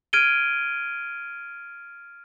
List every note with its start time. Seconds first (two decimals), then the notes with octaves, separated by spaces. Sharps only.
0.13 F6 G#6 D7 D#7 G7